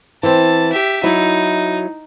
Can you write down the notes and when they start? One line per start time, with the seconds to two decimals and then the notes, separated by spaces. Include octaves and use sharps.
0.23 E3 C4 A5
0.72 G4 E5
1.03 F#3 D#4 E4